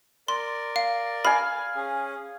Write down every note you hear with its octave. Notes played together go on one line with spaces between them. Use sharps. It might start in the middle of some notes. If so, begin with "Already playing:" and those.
A#4 D5 C6
F5
F5 G#5 B5
C#4 G#4